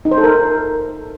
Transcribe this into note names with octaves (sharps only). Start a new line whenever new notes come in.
D#4
C5
A4
A#4